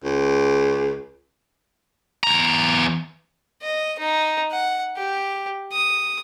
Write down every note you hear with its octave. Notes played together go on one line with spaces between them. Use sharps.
C#2
E2 A#5
D#5
D#4
F#5
G4
D#6